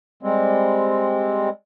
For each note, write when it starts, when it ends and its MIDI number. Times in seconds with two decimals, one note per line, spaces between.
0.23 1.49 55
0.23 1.49 56
0.23 1.49 60